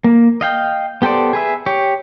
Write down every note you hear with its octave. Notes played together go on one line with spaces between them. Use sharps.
A#3
D#5 F5 G5
B3 G4 A4 C5 D5
G#4 B4 E5
G4 C#5